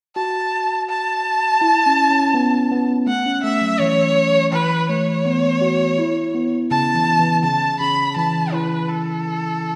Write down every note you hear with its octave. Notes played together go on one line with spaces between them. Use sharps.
F#4 A5
A5
E4
C#4
C#4
B3
B3
A3 F#5
C#4
A3 E5
F#3
E3 C#5
E3 B4
A3 C#5
B3
F#4
E4
B3
C#3 A5
E3
E3
C#3 A5
C#3 B5
E3 A5
E4 B4
A4